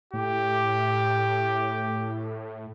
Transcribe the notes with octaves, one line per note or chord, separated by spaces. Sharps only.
A2 G4